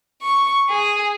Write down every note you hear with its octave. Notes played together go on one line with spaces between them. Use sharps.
C#6
G#4